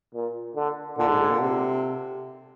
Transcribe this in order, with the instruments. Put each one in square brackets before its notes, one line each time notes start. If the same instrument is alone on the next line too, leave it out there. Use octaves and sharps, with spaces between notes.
[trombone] A#2
D3
[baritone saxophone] A#2 [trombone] D3
[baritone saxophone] G#2
G#2
A#2
C3